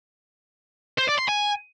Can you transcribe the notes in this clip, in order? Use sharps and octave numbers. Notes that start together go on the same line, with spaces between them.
C5
D5
C6
G#5